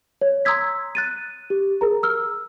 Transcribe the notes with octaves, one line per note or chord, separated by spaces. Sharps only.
C#5
A#5 C6 D#6 E6 G#6 B6
F#6 A6 D#7
G4
G#4 A#4 A#5
E6 F6